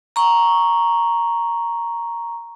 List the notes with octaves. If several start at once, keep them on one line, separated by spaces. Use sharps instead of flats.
A#5 C#6